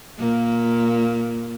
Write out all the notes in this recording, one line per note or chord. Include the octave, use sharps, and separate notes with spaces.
A#2 A#3